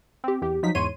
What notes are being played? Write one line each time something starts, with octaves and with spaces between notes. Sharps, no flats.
C4 G4
E2 G4
F3 F#3 D#4 B6
E2 G#2 C#5 C6 D#7